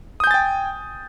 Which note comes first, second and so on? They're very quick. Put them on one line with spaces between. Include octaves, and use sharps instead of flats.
D#6 G6 G#5 A6 G5